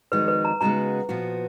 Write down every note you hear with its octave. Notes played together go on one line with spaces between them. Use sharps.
F2 D#3 G#3 D#4 F#4 B4
B4
A#5
C#3 G#3 B3 D#4 F#4 A#5
A#2 F3 B3 F#4